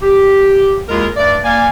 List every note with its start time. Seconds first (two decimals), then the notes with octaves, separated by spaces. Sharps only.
0.02 G4
0.89 D#2 G#3 E4 F4 G#4 A#4
1.17 G2 A3 D4 D5
1.44 A#3 D5 F5 G#5